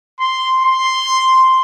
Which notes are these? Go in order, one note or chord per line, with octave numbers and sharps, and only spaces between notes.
C6
C6